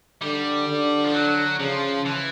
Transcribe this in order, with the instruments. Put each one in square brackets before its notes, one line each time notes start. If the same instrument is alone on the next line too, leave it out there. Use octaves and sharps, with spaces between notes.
[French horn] D3 [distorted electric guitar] G3
[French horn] D3
[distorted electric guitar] F3
F#3
[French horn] C#3 [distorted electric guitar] F3
[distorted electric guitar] E3